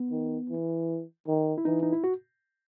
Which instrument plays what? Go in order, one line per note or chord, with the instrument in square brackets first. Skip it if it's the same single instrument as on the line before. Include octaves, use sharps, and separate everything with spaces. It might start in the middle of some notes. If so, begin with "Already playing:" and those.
Already playing: [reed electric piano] B3
[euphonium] D#3
E3
D#3
[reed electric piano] E4
[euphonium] E3 [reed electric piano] D#4
[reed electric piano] D#4
E4
F#4